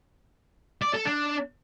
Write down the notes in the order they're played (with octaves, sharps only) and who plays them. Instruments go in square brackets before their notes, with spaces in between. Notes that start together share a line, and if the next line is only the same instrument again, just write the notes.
[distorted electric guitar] D5
A4
D4